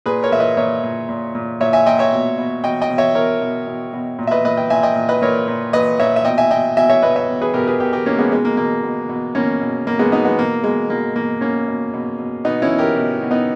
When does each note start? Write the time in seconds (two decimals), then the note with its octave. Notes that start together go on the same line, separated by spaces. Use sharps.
0.06 A#2 G#4 B4
0.23 A#4 C#5
0.32 A#2 E5
0.40 B4 D#5
0.57 A#2 C#5 E5
0.83 A#2
1.09 A#2
1.35 A#2
1.61 A#2 C#5 E5
1.73 E5 G#5
1.86 A#2 D#5 G5
1.99 C#5 E5
2.13 B2
2.38 B2
2.63 B2 D#5 G5
2.82 D#5 G5
2.90 B2
2.98 C#5 E5
3.15 B2 A#4 C#5
3.42 B2
3.67 B2
3.93 B2
4.19 A#2
4.27 E5
4.31 B4 D#5
4.44 A#2 B4 D#5
4.57 D#5 G5
4.70 A#2 E5 G#5
4.83 D#5 G5
4.96 A#2
5.09 B4 D#5
5.22 A#2 A#4 C#5
5.48 A#2
5.73 A#2 B4 D#5
5.99 A#2 C#5 E5
6.16 E5
6.25 B2 D#5 G5
6.38 E5 G#5
6.51 B2 D#5 G5
6.77 B2 E5 G#5
6.89 C#5 E5
7.03 B2 B4 D#5
7.16 C#5 E5
7.29 B2
7.41 G#4 B4
7.54 B2 G4 A#4
7.67 G#4 B4
7.80 B2 G4 A#4
7.93 G4 A#4
8.06 B2 A#3 C#4
8.18 G#3 B3
8.32 B2 G#3
8.45 A#3
8.57 B2 A#3
8.83 B2
9.09 B2
9.35 B2 A#3 C#4
9.61 B2
9.87 B2 A#3
9.99 G#3 B3
10.12 B2 B3 D#4
10.25 G#3 B3
10.39 B2 A#3
10.63 B2 G#3
10.90 B2 A#3
11.16 B2 A#3
11.41 B2 A#3 C#4
11.68 B2
11.94 B2
12.19 B2
12.45 B2 B3 D#4
12.62 C#4 E4
12.70 B2
12.79 G4 A#4
12.96 B2
13.22 B2
13.31 B3 D#4